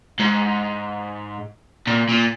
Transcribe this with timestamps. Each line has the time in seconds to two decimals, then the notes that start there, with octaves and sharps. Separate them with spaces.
0.20 G#2
1.87 A#2
2.09 A#2